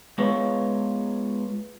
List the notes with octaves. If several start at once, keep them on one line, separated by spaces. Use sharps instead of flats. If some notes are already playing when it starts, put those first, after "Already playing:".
G#3 B3 F4 B4 C#5